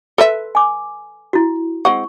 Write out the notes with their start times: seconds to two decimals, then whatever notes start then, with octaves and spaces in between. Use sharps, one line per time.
0.18 A4 B4 E5 C6
0.55 G#5 D6
1.33 E4 F#4
1.85 G#3 C4 F#5 C#6